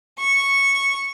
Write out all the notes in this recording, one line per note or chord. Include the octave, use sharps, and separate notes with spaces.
C#6